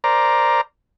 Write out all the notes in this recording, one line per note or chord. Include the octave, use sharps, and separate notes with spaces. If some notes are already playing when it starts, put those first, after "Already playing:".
A#4 C5 D5 A#5